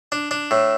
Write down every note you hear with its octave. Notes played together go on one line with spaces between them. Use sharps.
D4
D4
A2